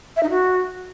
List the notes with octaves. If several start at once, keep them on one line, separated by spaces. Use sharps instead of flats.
E5
D#4
F#4